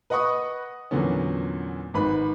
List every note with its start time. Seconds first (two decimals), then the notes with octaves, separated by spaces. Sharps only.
0.10 B4 D#5 F#5 B5 C#6 D#6
0.91 E2 A#2 D3 F#3 B3 C#4
1.94 G#1 G#2 B4 B5